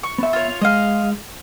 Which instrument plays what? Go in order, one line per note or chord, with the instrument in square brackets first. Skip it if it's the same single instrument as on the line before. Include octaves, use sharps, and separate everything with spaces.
[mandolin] C#6
[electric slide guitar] B3 E5
[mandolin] F4 C#5
[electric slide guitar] G#3 [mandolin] D#5 F5